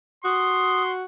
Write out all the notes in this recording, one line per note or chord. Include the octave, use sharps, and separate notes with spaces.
F#4 C6 D#6